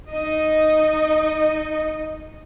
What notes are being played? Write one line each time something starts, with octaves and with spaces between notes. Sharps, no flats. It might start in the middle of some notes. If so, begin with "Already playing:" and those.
D#4 D#5